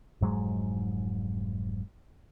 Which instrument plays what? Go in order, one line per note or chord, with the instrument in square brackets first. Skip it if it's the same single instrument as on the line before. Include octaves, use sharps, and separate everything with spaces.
[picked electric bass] F1 G#2 F#3 G#3